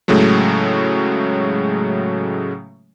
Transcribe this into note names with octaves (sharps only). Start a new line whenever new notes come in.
A2 C#3 F#3 G#3 A3